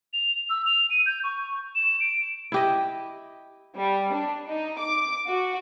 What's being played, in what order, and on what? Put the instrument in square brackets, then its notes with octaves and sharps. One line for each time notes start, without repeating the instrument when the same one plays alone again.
[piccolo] F7
E6
F7
D#7
G6
C#6
E7
D7
[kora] E4 G4 D#5
[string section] G3
D4
D#4
D6
F#4